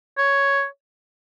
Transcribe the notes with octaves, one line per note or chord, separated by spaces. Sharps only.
C#5